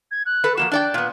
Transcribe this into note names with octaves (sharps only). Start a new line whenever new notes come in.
G#6
F#6
A4 B4
F3 A#3 F#4 E7
D4 D5 G5 F#6
A#2 B3